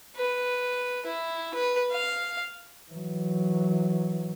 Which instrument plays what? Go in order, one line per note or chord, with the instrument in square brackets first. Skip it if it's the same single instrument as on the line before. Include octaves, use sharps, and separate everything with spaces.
[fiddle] B4
E4
B4
F5
[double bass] E3 F#3